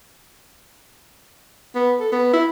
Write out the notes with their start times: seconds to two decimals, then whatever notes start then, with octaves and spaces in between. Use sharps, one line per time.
1.75 B3
2.00 A4
2.12 B3
2.34 E4